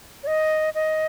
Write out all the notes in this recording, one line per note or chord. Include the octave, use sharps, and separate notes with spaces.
C#5
D#5
D#5